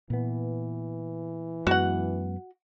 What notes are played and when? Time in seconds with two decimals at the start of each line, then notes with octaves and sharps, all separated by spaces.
0.10 A#2 E3 B3
1.67 F#2 G#3 B3 F#4 F#5